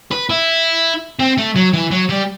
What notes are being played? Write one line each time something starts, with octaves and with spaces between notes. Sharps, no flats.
B4
E4
C4
A3
F#3
E3
F#3
G3